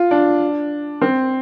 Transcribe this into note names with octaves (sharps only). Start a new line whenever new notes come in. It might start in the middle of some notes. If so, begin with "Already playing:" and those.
Already playing: F4
D4
C4